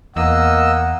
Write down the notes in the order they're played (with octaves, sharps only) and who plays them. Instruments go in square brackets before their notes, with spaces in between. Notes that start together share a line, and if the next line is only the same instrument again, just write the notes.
[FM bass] E2 [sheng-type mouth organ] A#3 D#5 E6 [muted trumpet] F#5